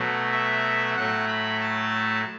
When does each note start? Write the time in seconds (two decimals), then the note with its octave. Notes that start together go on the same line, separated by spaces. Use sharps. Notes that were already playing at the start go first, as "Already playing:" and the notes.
Already playing: B2 F#3 A3
0.32 E5
0.96 A2 F#3 A3 F#5
1.28 B5
1.61 A5